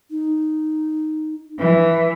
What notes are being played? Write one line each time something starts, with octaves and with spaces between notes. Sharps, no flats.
D#4
E3 B4